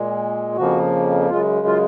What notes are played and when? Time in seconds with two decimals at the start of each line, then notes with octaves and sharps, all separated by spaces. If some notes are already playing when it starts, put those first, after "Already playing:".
Already playing: A#2 G#3
0.57 F2 C#3 F3 A#3 F#4
1.30 F#2 C#3 G#3 F4
1.67 F4